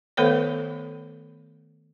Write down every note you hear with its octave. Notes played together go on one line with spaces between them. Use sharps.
D#3 A3 B3 A4 C5 C#5